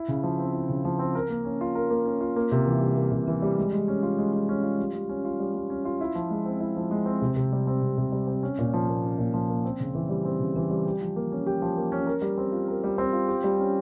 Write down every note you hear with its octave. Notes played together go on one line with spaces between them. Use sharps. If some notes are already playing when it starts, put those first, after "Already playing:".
Already playing: E4
C#3
F3
C4
E4
C#3
F3
C4
A#4
A#3
C#4
F4
A#4
A#3
C#4
F4
A#3
C3
E3
G3
A#3
C3
E3
G3
G#3
G#3
C#4
F4
G#3
G#3
C#4
F4
G3
G3
C#4
F4
G3
G3
C#4
F4
E4
F3
G#3
C4
E4
F3
G#3
C4
C3
C3
G3
C4
C3
C3
G3
C4
C#4
A#2
F3
A#3
C#4
A#2
F3
A#3
C4
C#3
E3
G3
C4
C#3
E3
G3
G4
F3
A#3
C#4
G4
F3
A#3
C#4
A#4
G3
C4
F4
A#4
G3
C4
F4
G4
G3
C#4